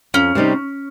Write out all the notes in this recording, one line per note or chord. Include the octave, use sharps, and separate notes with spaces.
F2 C#4
C3 G3 C4 D#4